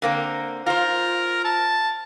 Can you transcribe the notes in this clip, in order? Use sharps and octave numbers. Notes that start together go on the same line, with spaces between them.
D3 A#3 C4
F4 A#4 C5
A5